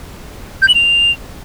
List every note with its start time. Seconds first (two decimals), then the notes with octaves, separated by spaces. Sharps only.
0.62 G6
0.68 F#7
0.75 F7